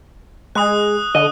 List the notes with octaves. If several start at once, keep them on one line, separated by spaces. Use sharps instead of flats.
G#3 D#6 F#6
D3 D#5